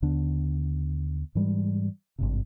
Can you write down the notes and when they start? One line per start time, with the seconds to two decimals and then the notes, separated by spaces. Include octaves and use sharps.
0.02 D#2 D3 B3 D4
1.35 G#2 E3 G3 G#3
2.19 G#1 G2 C3